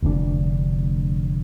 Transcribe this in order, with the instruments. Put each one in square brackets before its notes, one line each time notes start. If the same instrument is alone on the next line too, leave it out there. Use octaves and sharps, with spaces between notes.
[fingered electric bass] F1 D2 G#2 D4